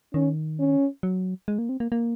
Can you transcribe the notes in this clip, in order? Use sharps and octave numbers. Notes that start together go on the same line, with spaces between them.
D#3 C#4
C#4
F#3
G#3
A#3
C4
A#3
A#3